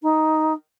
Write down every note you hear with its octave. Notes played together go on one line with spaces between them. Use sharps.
D#4